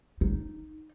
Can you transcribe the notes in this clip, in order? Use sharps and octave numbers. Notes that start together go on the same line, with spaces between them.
D#4